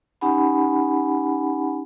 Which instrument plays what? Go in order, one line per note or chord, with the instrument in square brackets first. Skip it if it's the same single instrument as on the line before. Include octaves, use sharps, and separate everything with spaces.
[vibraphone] C#4 D#4 G4 F#5 G#5 B5